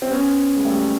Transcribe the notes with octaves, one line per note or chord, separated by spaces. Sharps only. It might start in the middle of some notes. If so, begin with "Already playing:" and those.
C4
B3 C#4
G#3
G3 A3